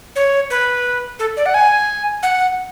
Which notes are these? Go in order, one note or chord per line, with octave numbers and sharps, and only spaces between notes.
C#5
B4
A4
D5
F#5
G#5
F#5